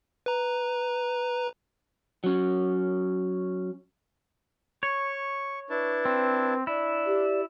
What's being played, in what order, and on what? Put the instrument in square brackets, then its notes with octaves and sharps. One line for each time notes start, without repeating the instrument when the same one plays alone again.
[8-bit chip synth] B4 A#5
[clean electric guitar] F#3 C#4
[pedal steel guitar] C#5 [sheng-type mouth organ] C#6
[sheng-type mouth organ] D4 E4 A5 [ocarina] B4
[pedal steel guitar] C4
[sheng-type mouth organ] D4 [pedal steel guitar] E4 [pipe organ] D5
[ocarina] G4